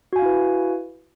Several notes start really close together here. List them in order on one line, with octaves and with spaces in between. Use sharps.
F#4 G#5 F5 E4 B4